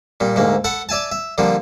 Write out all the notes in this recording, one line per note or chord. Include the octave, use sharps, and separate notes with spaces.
A#2 G3
D2 G#2 A#3
A4 F#5 B5
D5 E5 G#5 A5
E5
D3 F3 G3 A#3